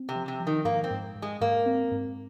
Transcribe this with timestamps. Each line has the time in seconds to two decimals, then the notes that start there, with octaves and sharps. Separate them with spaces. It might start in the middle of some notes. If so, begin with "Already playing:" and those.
Already playing: C4
0.09 C3
0.15 F3
0.28 C3
0.40 F3
0.47 D#3
0.65 G#2 A#3
0.84 C4
0.91 G#2
1.15 G#2
1.22 G#3
1.41 G#2 A#3
1.66 C4
1.91 G#2